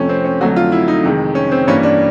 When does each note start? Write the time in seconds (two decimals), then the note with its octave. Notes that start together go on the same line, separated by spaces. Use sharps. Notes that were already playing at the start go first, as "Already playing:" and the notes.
Already playing: F2 C3 F3 A3 C#4
0.09 C4
0.25 C#4
0.41 F2 D3 F#3 A3 F#4
0.56 F4
0.72 E4
0.88 D#4
1.03 F2 C3 D#3 G#3
1.35 C#4
1.52 C4
1.67 G2 E3 G3 A#3 C#4
1.83 D4